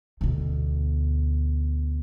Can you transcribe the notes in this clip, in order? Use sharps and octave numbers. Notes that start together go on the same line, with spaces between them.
D2 B2